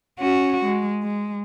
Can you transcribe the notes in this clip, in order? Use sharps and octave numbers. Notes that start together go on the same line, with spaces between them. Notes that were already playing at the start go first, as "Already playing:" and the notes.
C#4 F#4
G#3
G#3